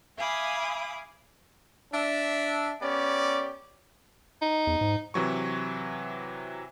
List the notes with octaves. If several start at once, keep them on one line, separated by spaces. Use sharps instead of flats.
E5 F5 G#5 B5 D6 D#6
D4 E5
B3 C#4 G4 D5
D#4
E2
G#2
C3 E3 F#3 C#6